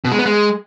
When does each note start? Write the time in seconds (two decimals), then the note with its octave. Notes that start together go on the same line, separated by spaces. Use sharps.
0.05 B2
0.12 G#3
0.19 B3
0.26 G#3